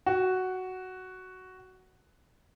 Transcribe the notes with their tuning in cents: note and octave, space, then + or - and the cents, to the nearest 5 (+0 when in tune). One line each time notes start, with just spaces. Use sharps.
F#4 +5